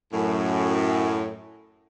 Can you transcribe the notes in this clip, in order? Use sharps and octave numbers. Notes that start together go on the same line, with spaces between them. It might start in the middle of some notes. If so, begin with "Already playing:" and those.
F#2 A2